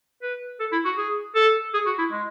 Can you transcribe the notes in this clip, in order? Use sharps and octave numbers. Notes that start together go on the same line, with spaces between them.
B4
A4
E4
F#4
G#4
A4
G#4
F#4
E4
G#3